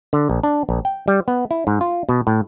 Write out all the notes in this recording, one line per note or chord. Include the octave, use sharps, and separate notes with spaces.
D3
A#1
D4
A#1
G5
G3
B3
E4
G#2
F4
B2
A2